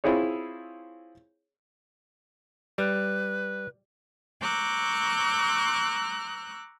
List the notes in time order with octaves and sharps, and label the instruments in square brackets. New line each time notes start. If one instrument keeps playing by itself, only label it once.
[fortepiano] C4 E4 F4 G#4 C#5
[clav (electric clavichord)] G3 [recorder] B4
[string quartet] A#5 C#6 D6 E6 F#6 G6